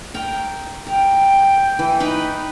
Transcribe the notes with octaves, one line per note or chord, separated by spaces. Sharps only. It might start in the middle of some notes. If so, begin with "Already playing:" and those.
A#4 G5
A#4 G5
E3
D#4 B4 G5